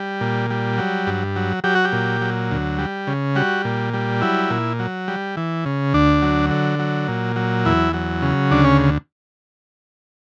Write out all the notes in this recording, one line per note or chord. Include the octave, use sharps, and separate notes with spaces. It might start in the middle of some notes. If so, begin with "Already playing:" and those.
Already playing: G3
A#2
G3
F#3
G2
F#3
F#3 G4
F#4
G4
A#2
F#3
D2
G3
C#3
G3 F#4
A#2
G3
F#3 E4
A#2
F#3
G3
E3
C#3
D2 D4
F#3
D3
F#3
A#2
F#3
E2 E4
F#3
C#3
D2 D4
C#4